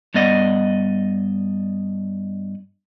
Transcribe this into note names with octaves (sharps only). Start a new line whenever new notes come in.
G2 B3 D5 D#5 F#5